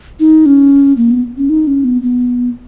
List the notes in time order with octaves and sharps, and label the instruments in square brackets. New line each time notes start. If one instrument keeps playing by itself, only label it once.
[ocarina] D#4
C#4
A#3
B3
C#4
D#4
C#4
B3
B3